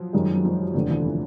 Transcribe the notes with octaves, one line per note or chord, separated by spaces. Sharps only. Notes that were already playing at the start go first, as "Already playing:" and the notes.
Already playing: F3 F#3
F#2 D#3 G3 G#3
F#3
F3
F1 D#2 D3 F3
E3
F3